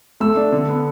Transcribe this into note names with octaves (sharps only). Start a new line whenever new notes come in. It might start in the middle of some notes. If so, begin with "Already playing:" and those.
A3 E6
D4
D3
B3